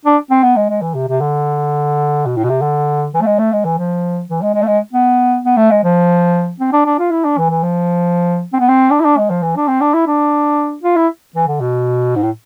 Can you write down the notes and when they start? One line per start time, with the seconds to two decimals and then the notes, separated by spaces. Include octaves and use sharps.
0.05 D4
0.31 C4
0.43 B3
0.56 G#3
0.70 G#3
0.82 E3
0.95 C3
1.08 C3
1.21 D3
2.26 B2
2.37 A2
2.44 B2
2.50 C3
2.62 D3
3.14 E3
3.21 A3
3.26 G#3
3.39 A3
3.53 G#3
3.65 E3
3.78 F3
4.29 E3
4.42 G#3
4.54 G#3
4.62 A3
4.67 G#3
4.93 B3
5.45 B3
5.57 A3
5.71 G#3
5.83 F3
6.60 C4
6.73 D4
6.86 D4
6.99 F4
7.11 E4
7.24 D4
7.38 E3
7.50 E3
7.63 F3
8.53 C4
8.60 B3
8.68 C4
8.91 D4
9.00 E4
9.05 D4
9.17 G#3
9.30 F3
9.43 E3
9.56 D4
9.68 C4
9.81 D4
9.94 E4
10.07 D4
10.83 F4
10.96 E4
11.36 E3
11.48 D3
11.61 B2
12.16 G#2
12.23 A2